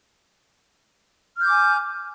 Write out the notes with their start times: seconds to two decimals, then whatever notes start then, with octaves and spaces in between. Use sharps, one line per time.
1.36 F6
1.40 G6
1.44 D6
1.48 G#5